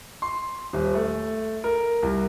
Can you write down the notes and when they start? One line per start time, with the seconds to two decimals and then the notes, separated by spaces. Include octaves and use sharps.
0.22 C6
0.73 D#1
0.94 A3
1.64 A#4
2.03 C2